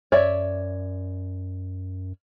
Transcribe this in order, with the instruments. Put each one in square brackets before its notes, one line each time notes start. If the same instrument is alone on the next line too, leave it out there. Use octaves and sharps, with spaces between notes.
[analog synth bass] F#2 [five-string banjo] C#5 D5 E5